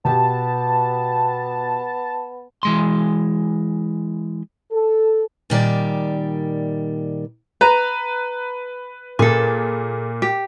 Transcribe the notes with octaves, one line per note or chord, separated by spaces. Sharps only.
B2 B3 G4 A5
E3 G#3 C6
A4
A#2 D#3 G3 D5
B4 A#5
A#2 G#4 A4
G4